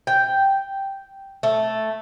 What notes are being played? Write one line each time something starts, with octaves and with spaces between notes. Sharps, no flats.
G5
A3